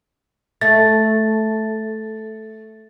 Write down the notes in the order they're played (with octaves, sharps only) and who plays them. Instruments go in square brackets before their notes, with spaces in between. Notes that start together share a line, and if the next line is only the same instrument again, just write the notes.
[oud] A3 [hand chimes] A6